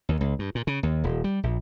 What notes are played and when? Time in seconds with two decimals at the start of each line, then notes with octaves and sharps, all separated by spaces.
0.09 D#2
0.21 C#2
0.39 G2
0.55 A#2
0.67 C#3
0.83 D#2
1.04 D#1
1.24 G3
1.43 A#1